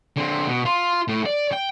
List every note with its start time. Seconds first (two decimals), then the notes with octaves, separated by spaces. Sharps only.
0.16 D3 C4
0.47 B2
0.65 F4
1.08 A2
1.26 D5
1.52 G5